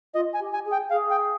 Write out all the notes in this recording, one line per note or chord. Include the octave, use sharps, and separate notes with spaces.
F4 D#5
G#5
G4
G#5
G#4
G5
G#4 F5
G5